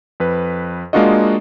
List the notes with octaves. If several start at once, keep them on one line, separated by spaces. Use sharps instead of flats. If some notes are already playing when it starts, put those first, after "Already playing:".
F2 B4
G#3 A#3 D4 F4 F#4 D#5